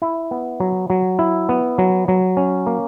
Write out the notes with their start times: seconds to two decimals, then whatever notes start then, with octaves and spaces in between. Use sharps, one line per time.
0.02 E4
0.31 B3
0.60 F#3
0.90 F#3
1.19 E4
1.49 B3
1.78 F#3
2.08 F#3
2.37 C#4
2.67 A#3